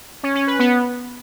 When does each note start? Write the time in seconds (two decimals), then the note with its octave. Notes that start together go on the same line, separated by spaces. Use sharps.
0.23 C#4
0.35 C#4
0.47 B4
0.59 B3